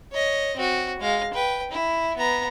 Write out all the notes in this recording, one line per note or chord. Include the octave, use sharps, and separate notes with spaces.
C#5 D#5
C4 F#4
G#3 F5
B4 G5
E4
B3 A#5